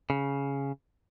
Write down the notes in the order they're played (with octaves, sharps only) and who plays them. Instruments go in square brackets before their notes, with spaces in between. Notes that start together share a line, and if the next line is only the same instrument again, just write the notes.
[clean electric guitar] C#3